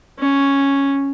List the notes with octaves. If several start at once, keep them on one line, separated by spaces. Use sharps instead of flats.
C#4